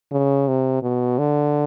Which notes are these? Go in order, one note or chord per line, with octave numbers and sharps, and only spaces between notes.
C#3
C3
B2
D3